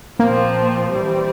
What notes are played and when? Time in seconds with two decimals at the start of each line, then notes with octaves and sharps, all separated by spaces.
0.19 A#2 F3 A#3 C4
0.90 E3 G3 C4